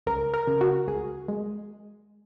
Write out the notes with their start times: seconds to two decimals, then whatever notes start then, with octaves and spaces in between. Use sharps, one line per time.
0.07 C#2 A#4
0.34 A#4
0.47 C#3
0.61 F#4
0.87 C#2 G#4
1.28 G#3